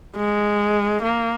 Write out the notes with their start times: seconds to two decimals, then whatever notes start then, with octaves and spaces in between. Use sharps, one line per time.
0.17 G#3
1.03 A#3